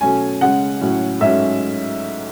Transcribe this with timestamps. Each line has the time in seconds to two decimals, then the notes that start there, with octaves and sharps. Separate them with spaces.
0.01 B2 F#3 A3 C#4 G#5
0.41 C#3 G#3 C#4 F#5
0.81 A2 F#3 C#4
1.20 G#2 F#3 A3 C#4 E5